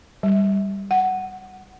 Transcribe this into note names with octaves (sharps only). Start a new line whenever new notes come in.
G3
F#5